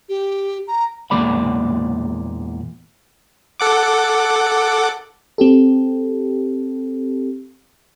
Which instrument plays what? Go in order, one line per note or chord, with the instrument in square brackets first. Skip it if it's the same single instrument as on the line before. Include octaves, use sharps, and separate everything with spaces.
[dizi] G4
A#5
[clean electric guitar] E2 A#2 G#3 A#3 D5 B5
[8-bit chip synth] A4 F#5 D6
[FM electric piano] C4 G4 A4